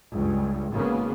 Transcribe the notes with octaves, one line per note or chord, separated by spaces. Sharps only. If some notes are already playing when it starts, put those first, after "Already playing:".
C#2 G2
G#1 C#3 A#3 B3